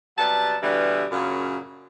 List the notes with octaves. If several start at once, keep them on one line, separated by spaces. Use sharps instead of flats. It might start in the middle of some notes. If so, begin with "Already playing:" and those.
C3 F#3 G3 B3 A5
B2 D3 E3 G3
F#2 A#2 C#3